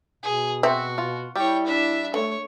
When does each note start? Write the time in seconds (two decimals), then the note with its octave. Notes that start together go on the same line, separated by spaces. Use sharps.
0.23 B2 G#4
0.63 C4 F#4 E5
0.98 F4
1.36 G3 E4 C#5 G5
1.66 D4 E5
2.14 D3 A3 C#5